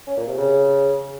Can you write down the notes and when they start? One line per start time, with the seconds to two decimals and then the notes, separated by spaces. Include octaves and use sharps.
0.07 C#4
0.17 A#2
0.27 C3
0.37 C#3